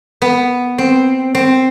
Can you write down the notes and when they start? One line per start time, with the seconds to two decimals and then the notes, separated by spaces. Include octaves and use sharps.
0.22 B3
0.78 C4
1.35 C4